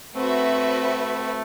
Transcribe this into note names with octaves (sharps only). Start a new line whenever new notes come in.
A3 C4 F#4 B4 E5